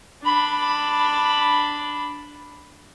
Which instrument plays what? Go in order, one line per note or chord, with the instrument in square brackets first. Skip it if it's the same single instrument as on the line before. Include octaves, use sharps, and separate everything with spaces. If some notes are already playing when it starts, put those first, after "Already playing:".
[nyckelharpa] D4 B5